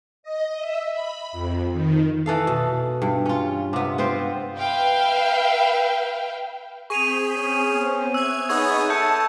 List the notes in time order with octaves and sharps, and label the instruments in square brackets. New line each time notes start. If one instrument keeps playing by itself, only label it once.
[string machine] D#5
E5
B5
F2
D#3
[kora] E3 A4 F5
B2
G2
C#4 F4
C3 B3
B3 C4 F4 C5
[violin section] B4 E5 F5 G5
[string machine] C4 G6 B6 [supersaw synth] G#4 [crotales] C#6 D#7 F7
[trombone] C#4
[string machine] B3 C4 C5
[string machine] E5 G#5 D#6 [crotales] E6 [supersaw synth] F#6 G#6
[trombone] B3 [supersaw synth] D#4 G#4 C#5 [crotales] C#6 E6 G#6
[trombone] A4 [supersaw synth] A5 [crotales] G6 C#7